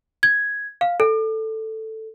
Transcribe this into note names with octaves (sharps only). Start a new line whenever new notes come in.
G#6
F5
A4